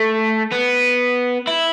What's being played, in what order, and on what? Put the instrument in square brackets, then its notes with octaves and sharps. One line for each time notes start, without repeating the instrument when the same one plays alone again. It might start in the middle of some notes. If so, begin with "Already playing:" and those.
Already playing: [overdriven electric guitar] A3
B3
E4